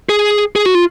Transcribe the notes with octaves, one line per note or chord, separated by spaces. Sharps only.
G#4
G#4
F#4
F4